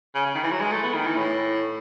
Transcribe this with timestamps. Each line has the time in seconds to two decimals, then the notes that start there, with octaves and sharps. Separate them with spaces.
0.15 C#3
0.26 C#3
0.35 D#3
0.43 E3
0.52 F#3
0.61 G#3
0.71 A3
0.83 B3
0.95 D#3
1.06 E3
1.17 A2